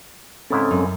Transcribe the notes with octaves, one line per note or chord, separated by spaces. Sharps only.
G#2 C#3 C4 C#4 E4 A4
F#2